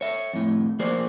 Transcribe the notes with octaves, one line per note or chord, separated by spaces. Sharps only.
C#5 E5
F2 A2
F3 A#3 G#4 C5 D5